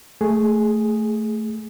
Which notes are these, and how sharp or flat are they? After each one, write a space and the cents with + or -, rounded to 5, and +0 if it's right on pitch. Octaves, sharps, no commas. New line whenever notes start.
A3 +0 G#4 +0